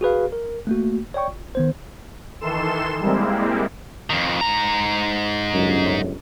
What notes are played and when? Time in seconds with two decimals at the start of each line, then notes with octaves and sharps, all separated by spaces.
0.01 F#4 G#4 B4 F5
0.33 A#4
0.67 A3 A#3 F#4
1.14 C#5 D5 G5 C#6
1.28 G1
1.55 D#3 B3 C5
2.41 D#3 E3 A4 C6 E7
3.00 G3 G#3 A#3 C4 E4
4.10 F2 D#3
4.41 G#2 A#5
5.53 G1 C#2 F#2